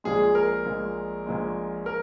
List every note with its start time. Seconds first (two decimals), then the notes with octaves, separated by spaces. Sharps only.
0.04 A#1 A#2 G#3 G#4
0.35 A#4
0.66 A#1 A#2 G#3
1.26 A#1 A#2 G#3
1.86 A#4